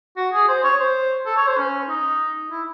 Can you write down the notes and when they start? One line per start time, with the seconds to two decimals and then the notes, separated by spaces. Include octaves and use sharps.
0.17 F#4
0.33 G#4
0.48 C5
0.64 C#5
0.80 C5
1.26 A4
1.37 C#5
1.47 C5
1.57 C#4
1.89 D#4
2.51 E4